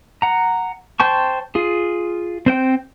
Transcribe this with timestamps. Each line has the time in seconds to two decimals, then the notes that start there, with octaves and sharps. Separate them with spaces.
0.22 F#5 A#5
1.00 C5 G5 A5 C#6
1.55 F4 G#4
2.46 C4 C5 G5